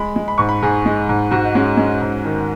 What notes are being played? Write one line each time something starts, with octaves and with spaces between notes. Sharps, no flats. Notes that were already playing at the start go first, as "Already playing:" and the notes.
Already playing: G#3 B5
G#3
B5
G#2 C#6
B5
G#2 G#4
G#3
G#2
G#2 F#4
D#4
G#3 C#4
G#3 C#4
G#2
D#3